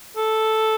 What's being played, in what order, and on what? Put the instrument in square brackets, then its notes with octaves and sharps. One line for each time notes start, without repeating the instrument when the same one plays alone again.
[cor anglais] A4